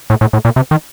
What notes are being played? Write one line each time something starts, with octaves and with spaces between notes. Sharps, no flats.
A2
A2
A2
A#2
C3
D#3